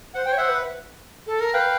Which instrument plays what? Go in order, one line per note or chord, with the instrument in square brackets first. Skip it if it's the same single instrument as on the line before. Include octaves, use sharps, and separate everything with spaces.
[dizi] C5 [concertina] F#5
[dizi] C5 [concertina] G5
[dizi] C#5
[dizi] C5 [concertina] E5 F#5
[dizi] B4
A4
A#4
[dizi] B4 [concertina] F5 G5